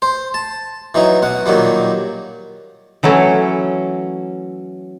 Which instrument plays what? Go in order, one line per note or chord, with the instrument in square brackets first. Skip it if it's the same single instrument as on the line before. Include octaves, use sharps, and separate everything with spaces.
[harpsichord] C5
A5
E3 F#3 D#4
B2 F#5
A#2 D#3 F#3 G3
[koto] E3 F#3 A3 C#4 E4